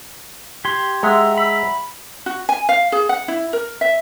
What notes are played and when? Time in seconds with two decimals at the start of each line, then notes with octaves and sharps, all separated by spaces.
0.65 G4 C6 G#6
1.03 G#3 E5 F#5 A#5 E6
1.38 B5
2.26 F#4
2.49 G#5
2.69 F5
2.92 G#4
3.09 F#5
3.28 E4
3.53 A#4
3.81 E5